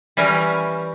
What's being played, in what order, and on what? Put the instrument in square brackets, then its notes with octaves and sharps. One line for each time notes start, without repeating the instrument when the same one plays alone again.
[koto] E3 G3 C#4 A#4